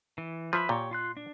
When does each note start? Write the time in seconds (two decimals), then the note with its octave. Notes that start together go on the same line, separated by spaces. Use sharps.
0.18 E3
0.53 F3 B4 E5 B5
0.69 A#2 G4 C#5
0.91 F4 C6 F#6
1.17 D4